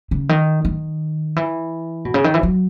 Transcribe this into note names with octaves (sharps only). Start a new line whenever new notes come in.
C#3
D#3
D#3
E3
B2
C#3
D#3
E3
F#3